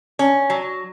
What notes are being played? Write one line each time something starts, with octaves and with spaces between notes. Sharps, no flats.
C#4
F#3